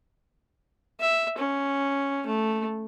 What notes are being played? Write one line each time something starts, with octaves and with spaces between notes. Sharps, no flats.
E5
C#4
A3